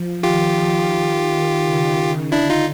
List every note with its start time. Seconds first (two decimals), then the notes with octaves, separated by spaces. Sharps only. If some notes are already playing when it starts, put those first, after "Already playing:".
Already playing: F3
0.23 D#3 F4 G4
1.63 C#3
2.32 D3 D4 E4
2.50 D#4 F4